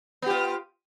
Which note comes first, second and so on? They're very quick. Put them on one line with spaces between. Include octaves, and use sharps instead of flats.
B3 G4 F4